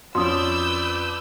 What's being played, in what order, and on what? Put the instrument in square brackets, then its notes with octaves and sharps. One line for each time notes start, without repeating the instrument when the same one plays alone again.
[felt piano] F2 C#4 [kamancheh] B4 D5 [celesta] C6 D#6 [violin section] E6 G6